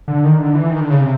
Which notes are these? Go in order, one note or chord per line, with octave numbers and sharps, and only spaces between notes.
D3
D#3
D3
E3
D#3
D3
C#3
C3